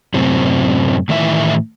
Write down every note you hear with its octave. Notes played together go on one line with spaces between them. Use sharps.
F#2 A2 C3 C4
A2 D#3 E3 E5